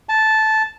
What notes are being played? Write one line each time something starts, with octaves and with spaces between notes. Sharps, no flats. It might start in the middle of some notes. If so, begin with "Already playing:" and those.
A5